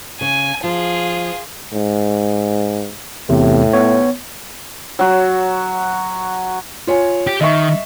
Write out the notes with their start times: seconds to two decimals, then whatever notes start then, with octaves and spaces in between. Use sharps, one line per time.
0.21 C#3 G#5
0.64 F3 F4 G#4
1.73 G#2
3.29 E2 A2 C3
3.73 B3 C#5
4.99 F#3 F#4
6.87 F4 C#5 G#5
7.27 G4
7.41 D#3 D#5 E5 C#6